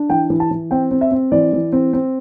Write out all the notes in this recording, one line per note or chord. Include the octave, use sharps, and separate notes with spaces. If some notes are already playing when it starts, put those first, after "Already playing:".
Already playing: D4
E3 G5
E3
A5
E3
C4 G5
C4
E5
C4
E3 D5
E3
C4
C4